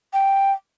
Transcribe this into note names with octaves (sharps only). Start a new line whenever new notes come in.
G5